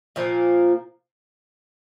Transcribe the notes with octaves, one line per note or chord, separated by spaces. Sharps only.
A#2 F3 A#3